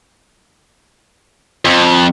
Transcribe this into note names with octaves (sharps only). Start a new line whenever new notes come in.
F2